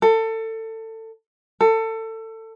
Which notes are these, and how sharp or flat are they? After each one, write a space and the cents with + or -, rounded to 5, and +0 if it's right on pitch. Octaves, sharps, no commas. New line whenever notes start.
A4 +25
A4 +25